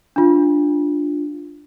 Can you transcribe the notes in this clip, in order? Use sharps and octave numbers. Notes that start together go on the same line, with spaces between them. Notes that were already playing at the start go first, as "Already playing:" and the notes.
D4 F4